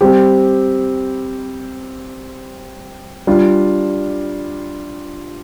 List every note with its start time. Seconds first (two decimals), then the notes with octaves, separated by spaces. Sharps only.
0.01 G3 C4 G4
3.27 G3 D4 F4